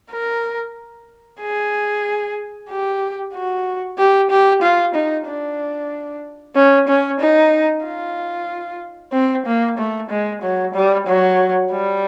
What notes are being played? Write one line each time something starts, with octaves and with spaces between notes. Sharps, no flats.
A#4
G#4
G4
F#4
G4
G4
F4
D#4
D4
C#4
C#4
D#4
F4
C4
A#3
A3
G#3
F#3
G3
F#3
G3